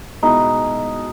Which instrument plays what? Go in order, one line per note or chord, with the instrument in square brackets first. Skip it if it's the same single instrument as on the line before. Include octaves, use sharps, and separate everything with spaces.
[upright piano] B2 G#3 B3 E4 [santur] D#4